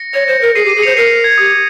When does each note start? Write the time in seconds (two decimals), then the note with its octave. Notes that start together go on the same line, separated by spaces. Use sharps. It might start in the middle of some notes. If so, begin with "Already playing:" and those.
Already playing: A#6 C#7
0.14 C#5
0.28 C5
0.41 A#4
0.55 G#4 C7 D#7
0.65 G4
0.69 C7 D#7
0.76 G#4
0.82 C5 C#7 F7
0.97 A#4 C7 D#7
1.10 C7
1.24 G#6
1.38 G4 D#6